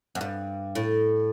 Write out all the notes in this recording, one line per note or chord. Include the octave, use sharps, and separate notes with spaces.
F#2
G2
A2